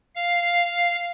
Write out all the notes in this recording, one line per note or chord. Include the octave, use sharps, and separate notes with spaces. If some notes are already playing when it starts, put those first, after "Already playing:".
F5